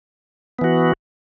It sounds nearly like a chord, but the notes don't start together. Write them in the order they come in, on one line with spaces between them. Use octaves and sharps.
B3 E3 F#4